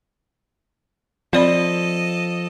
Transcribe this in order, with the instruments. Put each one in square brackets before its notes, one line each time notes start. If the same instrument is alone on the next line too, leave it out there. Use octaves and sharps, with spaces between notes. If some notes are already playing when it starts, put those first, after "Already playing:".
[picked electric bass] F3 [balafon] C4 D5 B5 [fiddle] A4 D#5